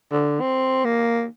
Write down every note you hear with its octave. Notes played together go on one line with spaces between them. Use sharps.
D3
C4
A#3